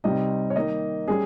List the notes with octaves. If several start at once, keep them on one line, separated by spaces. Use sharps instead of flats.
C3 G3 C4 D#4 D#5
C#5
D#3 A#3 D#4 D#5
G3 C#4 G#4